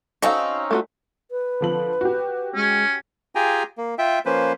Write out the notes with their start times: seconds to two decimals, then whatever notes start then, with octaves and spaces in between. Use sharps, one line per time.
0.22 C4 C#4 D#4 F#4 A4 F5
0.71 A3 F4 F#4
1.31 B4
1.61 D3 F3 F#7
2.01 F#4 G4
2.55 G#3 C#4
3.35 F4 G4 G#4 G5 G#5 A#5
3.78 A#3
3.98 F4 E5 G5
4.26 F3 A#3 C#4 B4 C5